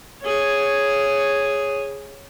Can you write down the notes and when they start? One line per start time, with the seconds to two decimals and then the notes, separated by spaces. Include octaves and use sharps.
0.22 G#4 C#5